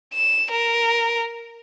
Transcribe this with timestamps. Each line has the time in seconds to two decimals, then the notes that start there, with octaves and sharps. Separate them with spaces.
0.14 E7
0.51 A#4